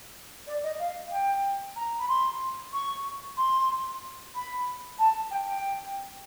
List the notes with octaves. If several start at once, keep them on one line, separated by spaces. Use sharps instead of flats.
D5
D#5
F5
G5
A#5
B5
C6
C#6
C6
B5
A5
G5
G5